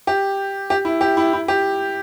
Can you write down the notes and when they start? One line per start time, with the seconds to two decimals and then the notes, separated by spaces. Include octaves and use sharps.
0.07 G4
0.70 G4
0.85 E4
1.01 G4
1.17 E4
1.33 E4
1.48 G4